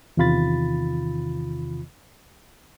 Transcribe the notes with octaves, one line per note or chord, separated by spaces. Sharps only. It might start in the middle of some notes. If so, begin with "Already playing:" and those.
E2 C3 D#3 F4 B5 A6